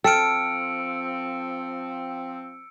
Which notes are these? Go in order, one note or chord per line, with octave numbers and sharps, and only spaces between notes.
F3 C4 A4 G5 E6 F6 C#7 D7